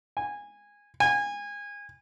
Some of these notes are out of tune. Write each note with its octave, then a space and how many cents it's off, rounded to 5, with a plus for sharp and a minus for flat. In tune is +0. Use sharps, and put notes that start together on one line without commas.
G#5 -15
G#5 -25